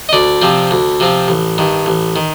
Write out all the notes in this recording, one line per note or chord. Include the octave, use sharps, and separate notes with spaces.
D#5
D2 D5
C3 F3 C4
D2
C3 F3 C4
A1
G2 D#3
A1
D#3